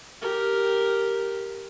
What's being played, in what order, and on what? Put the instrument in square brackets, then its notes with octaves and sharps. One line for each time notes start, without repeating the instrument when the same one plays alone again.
[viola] G4 A#4